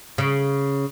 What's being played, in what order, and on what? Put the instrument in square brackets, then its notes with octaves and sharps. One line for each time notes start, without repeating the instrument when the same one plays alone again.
[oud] C#3